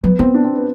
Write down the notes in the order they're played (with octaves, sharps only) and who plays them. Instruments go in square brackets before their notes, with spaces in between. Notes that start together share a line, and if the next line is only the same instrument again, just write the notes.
[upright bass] F#3 [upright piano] B3
[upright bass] B3 [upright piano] C4
[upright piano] D4
C4
B3